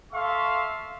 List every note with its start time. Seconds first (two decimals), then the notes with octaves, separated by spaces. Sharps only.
0.13 A4 E5 F5 C6 C#6